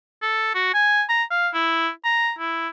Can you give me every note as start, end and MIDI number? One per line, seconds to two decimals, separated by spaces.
0.22 0.54 69
0.55 0.73 66
0.74 1.03 80
1.09 1.23 82
1.31 1.48 77
1.54 1.89 64
2.04 2.32 82
2.39 2.68 64